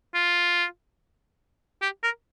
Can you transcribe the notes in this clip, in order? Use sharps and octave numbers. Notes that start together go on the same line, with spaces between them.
F4
G4
A#4